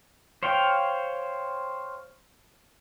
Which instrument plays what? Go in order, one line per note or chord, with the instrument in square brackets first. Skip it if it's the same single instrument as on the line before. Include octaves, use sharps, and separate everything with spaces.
[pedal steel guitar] C5 C#5 F5 G5